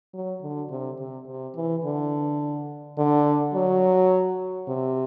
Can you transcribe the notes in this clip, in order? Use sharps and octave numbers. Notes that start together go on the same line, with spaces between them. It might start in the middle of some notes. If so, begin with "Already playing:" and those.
F#3
D3
C3
C3
C3
E3
D3
D3
F#3
C3